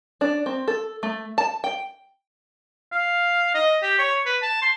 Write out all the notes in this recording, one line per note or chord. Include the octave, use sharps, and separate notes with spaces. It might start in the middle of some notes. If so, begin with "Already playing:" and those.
D4
C4
A4
A3
A5
G5
F5
D#5
G4
C#5
B4
A5
C6